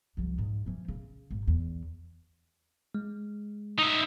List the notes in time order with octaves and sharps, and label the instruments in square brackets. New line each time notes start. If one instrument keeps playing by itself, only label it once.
[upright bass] C2 F3
G#2
E3 F3
C#3
G#1
E2
[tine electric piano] G#3
[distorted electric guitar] D#4 E5